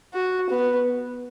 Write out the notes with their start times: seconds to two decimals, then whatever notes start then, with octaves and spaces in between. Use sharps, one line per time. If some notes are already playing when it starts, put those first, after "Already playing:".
0.14 F#4
0.50 B3